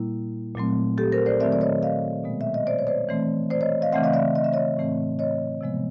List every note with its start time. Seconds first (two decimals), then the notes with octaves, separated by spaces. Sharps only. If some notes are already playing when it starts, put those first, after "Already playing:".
Already playing: A#2 G3 A#3 E4
0.55 A#2 F#3 A3 C4
0.98 G4 A4
1.12 A#4 C5
1.26 C5 D5
1.40 D#3 F#3 A3 C4 D5 E5
1.52 D5
1.61 C#5 D#5
1.83 D#5 F5
2.24 B2 G#3 B3
2.41 E5
2.54 D#5
2.67 C5 D5
2.79 C#5
2.87 C5 D5
3.09 E3 A3 C4
3.50 C5 D5
3.61 C#5 D#5
3.82 D#5 F5
3.93 C#3 E3 A3 C4 E5 F#5
4.03 D#5 F5
4.13 D5 E5
4.35 D#5
4.44 E5
4.53 C#5 D#5
4.77 A2 E3 A3 C4
5.19 C#5 D#5
5.61 C3 F3 G#3 B3